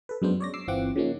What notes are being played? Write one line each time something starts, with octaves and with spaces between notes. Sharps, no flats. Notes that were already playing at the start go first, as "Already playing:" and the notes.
A4 B4
F#2 F#3 G#3 B3 D4 C5
C#5 D5 A#6
D6 E6 C7
G1 E3 C4 F4 F#5 D6
C#3 F3 A#3 C#4 D#4